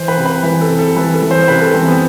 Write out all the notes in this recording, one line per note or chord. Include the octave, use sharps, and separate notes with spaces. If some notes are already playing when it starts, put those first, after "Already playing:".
Already playing: E3 C5
B4
C3
B4
E3 B4
A4
C3
A4
E3 B4
A4
E3
C5
C3 B4
A4
E3 C4
B3